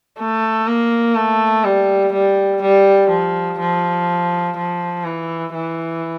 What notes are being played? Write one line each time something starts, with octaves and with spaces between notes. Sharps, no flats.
A3
A#3
A3
G3
G3
G3
F3
F3
F3
E3
E3